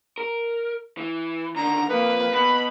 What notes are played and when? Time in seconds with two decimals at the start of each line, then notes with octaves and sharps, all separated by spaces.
0.18 A#4
0.97 E3
1.56 D3 D#3 A#5
1.89 F2 A#3 B4
2.33 B2 B5